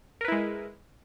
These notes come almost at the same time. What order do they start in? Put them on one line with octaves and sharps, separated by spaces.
A#4 B4 E4 G#3